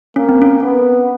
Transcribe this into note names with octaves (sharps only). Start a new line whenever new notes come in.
A#3 C#4
C4
C#4
B3